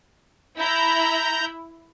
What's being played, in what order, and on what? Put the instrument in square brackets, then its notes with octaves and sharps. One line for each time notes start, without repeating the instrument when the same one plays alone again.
[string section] E4 [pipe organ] A#5 G6